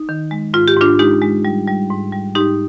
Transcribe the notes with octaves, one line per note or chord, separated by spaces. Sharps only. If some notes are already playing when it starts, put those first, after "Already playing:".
Already playing: D#4
D#3
G#3
G#2 F4
G4
G#2 D4 F4
G#3 D#4 G4
G#3
G3
G3
G#2
G3
G#2 D#4 G4